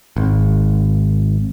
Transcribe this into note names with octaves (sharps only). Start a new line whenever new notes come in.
G#1